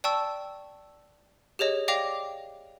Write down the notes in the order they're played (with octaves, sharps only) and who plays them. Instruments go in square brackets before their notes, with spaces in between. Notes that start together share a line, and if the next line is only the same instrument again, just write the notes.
[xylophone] D5 G5 A5 C#6 E6
G4 G#4 C#5 D#5
D5 F5 G5 D6 A#6 F7